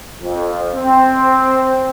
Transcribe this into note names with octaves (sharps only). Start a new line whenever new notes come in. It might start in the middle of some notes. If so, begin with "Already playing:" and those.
F2
C4